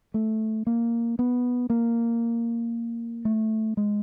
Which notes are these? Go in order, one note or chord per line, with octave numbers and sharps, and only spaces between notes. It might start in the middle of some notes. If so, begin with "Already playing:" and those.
A3
A#3
B3
A#3
A3
G#3